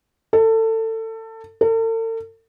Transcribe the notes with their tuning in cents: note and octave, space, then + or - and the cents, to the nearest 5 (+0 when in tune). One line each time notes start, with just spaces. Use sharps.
A4 +25
A4 +45